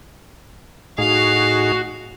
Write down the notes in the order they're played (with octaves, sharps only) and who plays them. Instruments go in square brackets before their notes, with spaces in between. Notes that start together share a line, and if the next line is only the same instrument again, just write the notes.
[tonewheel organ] A2 D#4 G#4 [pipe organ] F#4 [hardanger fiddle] F5